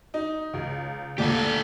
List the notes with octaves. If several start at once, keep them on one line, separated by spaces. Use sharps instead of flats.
D#4
C#2
D2 A#2 G4 A4